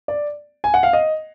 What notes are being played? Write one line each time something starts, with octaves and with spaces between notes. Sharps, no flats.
D5
G#5
F#5
F5
D#5